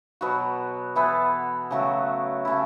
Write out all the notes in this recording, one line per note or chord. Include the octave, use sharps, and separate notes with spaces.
B2 F#3 B3 F#4
E3 B3 E4 A4
C#3 F#3 A3 F#4
C#3 A3 E4